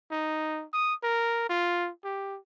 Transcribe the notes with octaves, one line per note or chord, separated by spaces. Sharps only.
D#4
D#6
A#4
F4
G4